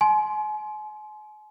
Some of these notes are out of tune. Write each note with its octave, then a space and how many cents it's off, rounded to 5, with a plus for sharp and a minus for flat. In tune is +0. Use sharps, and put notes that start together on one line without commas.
G#5 +40 C6 +0